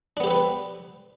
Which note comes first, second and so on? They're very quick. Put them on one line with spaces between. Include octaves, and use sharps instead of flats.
D4 B3 G4 C4 B4